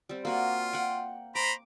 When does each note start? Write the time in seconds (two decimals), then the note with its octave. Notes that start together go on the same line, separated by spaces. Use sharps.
0.09 G3 C4
0.25 A#3 F4 F#4 D5
0.73 F#5 G5
1.35 C5 A#5 B5 D6